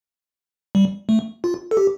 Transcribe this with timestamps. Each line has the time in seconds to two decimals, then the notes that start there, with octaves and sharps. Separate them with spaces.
0.75 G3
1.09 A3
1.44 F4
1.71 A4
1.77 G4